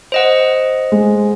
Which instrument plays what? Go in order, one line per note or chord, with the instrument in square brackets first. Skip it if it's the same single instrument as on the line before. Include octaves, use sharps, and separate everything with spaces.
[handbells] C5 D#5 F#5
[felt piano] G#3